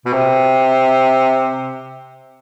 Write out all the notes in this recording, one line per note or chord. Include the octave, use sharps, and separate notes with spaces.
B2
C3